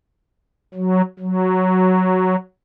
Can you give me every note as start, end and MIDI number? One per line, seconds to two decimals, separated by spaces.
0.74 1.02 54
1.19 2.36 54